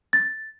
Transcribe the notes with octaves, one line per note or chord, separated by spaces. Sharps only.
A6